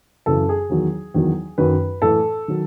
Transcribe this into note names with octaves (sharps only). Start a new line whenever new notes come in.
F#2 C#3 E3 A4
G#4
E2 D#3 F#3
E2 D#3 F#3
F#2 D#3 F#3 B4
A2 E3 A4
D#3 F#3